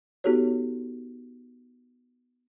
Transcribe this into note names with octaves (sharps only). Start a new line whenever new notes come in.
B3 D#4 F#4 G4 A4 C#5